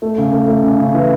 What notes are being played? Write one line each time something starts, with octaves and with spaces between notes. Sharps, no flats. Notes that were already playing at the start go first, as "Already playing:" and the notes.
A3
C#3
A3
A3
C#3
C#3
E3